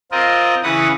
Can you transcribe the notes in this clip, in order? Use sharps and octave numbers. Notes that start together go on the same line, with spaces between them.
C4 F4 A#4 D#5
C#3 E3 B4 F#5 D#6